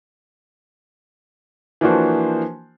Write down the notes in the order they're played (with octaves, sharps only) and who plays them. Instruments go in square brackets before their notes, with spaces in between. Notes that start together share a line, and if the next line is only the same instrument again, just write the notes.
[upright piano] E3 F3 A#3 D4 F#4 C5